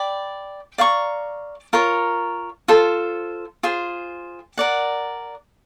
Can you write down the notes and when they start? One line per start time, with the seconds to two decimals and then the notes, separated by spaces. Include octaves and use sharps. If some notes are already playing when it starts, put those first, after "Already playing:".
Already playing: D5 G5 B5
0.78 D5 F5 A#5 C#6
1.73 F4 A#4 C#5
2.68 F4 A4 C5
3.63 F4 G#4 C5
4.58 A#4 D5 F#5